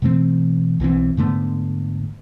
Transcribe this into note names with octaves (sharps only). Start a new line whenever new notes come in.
B2 E3 A3 C4
B1 E3 G3 C4
G#2 D3 A3 B3